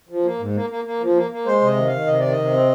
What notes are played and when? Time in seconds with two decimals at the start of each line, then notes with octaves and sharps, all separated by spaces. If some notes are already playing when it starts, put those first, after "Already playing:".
0.09 F3
0.24 A#3
0.39 G#2
0.54 A#3
0.70 A#3
0.84 A#3
1.01 F3
1.15 A#3
1.31 A#3
1.45 G#3 C5
1.61 C3 D#5
1.76 D#3
1.87 D#3 F5
2.07 C3 D#5
2.20 D#3 D5
2.32 D#5
2.38 C3
2.53 C4